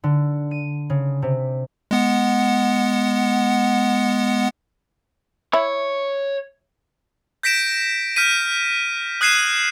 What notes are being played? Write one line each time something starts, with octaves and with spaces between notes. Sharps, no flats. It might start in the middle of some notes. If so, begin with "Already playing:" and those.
D3
D#7
C#3
C3
G#3 B3 F#5
E4 C#5
G6 A#6 B6 D7 E7
F6 G6 B6 D#7
D#6 F#6 G#6 C7 D#7 E7